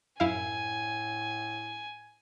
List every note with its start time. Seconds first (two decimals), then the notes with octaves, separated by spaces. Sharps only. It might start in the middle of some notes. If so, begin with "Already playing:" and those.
0.20 F#2 A2 E4 F5 G#5